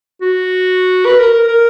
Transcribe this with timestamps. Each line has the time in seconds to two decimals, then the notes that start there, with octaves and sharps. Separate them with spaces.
0.21 F#4
1.06 B4
1.20 A#4
1.34 A#4
1.48 A#4